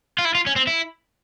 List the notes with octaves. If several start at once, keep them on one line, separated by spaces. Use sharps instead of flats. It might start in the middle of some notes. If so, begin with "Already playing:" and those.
F4
E4
F4
C#4
C4
E4